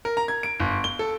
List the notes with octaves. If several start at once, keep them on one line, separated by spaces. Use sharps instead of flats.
A#4
A#5
G#6
D7
G1
G7
A4